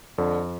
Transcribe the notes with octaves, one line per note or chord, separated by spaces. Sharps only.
F2 D3